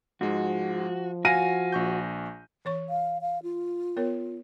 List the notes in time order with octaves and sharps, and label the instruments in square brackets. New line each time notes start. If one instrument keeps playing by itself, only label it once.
[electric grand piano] G#2 G#3 [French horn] F3 [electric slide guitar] F#4
[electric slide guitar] F#4 [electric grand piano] F5 [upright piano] G#5 A#6 D#7
[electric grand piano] A#1 C#6 G6
[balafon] E3 C#5 C#6
[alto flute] F5
F5
F4
[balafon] B3 A#4 C#5